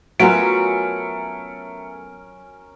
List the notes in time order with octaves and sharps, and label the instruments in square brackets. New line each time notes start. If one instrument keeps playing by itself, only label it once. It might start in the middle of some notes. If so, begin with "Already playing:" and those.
[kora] F#3 B3 F4 [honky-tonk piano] A3 [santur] C#4 A#4 [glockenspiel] D7